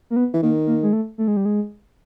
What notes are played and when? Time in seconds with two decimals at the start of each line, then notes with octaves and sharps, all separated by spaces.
0.10 A#3
0.16 B3
0.34 E3
0.43 D#3 A#3
0.67 A#3
0.83 G#3
0.93 A3
1.18 A3
1.28 G#3
1.37 G3
1.45 G#3